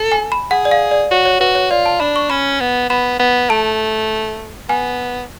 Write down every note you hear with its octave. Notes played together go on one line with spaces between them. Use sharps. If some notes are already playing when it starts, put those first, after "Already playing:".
Already playing: A4
G#5
B5
G#4 F#5
D5
F5
D5
F#4 C#5
C#5
F#4 B4
C#5
F4 D5
A5
D4 B5
C#6
C#4 B5
B3
B3 B5
B3
A3 A5
B3 G#5